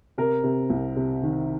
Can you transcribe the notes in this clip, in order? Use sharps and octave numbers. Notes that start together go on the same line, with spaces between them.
C3 A#4
C3
C2
C3
D#3